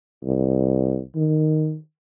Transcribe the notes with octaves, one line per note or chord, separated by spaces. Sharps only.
C2
D#3